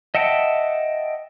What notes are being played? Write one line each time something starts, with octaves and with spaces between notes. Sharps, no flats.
D#5 E5 F#5 G5 A5